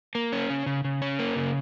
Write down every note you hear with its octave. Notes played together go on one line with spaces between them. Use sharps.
A#3
C#4
C#3
C#3
C#3
C#4
A#3
C#3